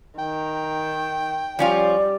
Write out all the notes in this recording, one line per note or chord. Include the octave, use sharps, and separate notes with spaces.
D#3 G5
F3 G3 C#4 F4 D5